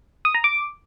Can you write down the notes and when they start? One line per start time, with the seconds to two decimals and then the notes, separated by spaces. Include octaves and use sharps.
0.25 D#6
0.34 A#5
0.44 D6